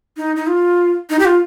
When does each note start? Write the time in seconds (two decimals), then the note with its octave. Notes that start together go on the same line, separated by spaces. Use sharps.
0.17 D#4
0.36 D#4
0.47 F4
1.10 D#4
1.19 G4
1.25 F4